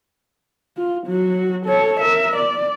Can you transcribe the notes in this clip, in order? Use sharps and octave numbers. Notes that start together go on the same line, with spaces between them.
F4
F#3 F#4
A4 C#5
A#4 E5
D5